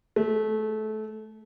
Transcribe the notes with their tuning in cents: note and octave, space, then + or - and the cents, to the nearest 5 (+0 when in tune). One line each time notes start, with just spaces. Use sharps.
A3 -25